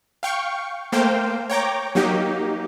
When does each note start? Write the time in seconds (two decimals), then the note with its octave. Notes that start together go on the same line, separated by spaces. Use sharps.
0.23 F5 G5 C#6
0.92 A3 A#3 C5 F5 G5
1.50 C#5 G5 A#5 D6
1.95 F#3 A#3 D#4 G4